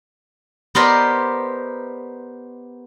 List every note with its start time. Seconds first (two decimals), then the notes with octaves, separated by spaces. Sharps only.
0.75 B3 G4 A#4 C5 D5 D#5